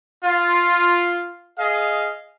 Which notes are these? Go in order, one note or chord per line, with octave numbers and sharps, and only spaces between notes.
F4
G#4 D#5 F5